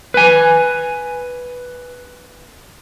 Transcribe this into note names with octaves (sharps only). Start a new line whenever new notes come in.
B4 G#5